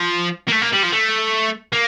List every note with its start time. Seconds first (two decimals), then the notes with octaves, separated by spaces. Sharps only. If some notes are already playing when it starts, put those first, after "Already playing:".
Already playing: F3
0.48 A#3
0.52 A3
0.62 A#3
0.73 G3
0.83 F3
0.92 A3
1.73 A#3